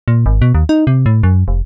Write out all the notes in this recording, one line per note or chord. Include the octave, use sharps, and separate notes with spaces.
A#2
G#1
B2
D#2
D#4
C3
A2
F#2
F1